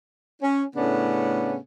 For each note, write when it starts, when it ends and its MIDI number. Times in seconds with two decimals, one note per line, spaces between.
0.42 0.63 61
0.75 1.56 45
0.75 1.56 49
0.75 1.56 57
0.75 1.56 59
0.75 1.56 61
0.75 1.56 62